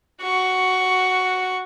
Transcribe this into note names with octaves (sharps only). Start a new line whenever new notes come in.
F#4 C#6